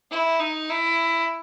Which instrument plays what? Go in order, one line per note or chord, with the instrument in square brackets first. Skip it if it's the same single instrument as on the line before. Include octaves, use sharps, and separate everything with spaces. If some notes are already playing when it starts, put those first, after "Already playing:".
[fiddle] E4
D#4
E4